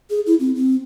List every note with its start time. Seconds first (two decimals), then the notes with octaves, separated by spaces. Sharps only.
0.10 G#4
0.26 E4
0.40 C4
0.55 C4